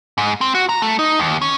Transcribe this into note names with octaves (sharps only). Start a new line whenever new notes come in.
G#2
C4
F#4
A#5
A3
D#4
D#2
C#4